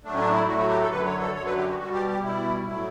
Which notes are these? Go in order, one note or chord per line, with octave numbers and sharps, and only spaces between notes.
A2 F#3 A3 D4
C#4
D4
E4
A2 F#3 A3 F#4
F#4
G4
A4
F#2 D3 F#3 B4
C#5
A4
F#2 D3 F#3 C#5
B4
G4
F#4
B2 G3 F#4
G4
G4
B2 G3 E4
A2 F#3 A3 E4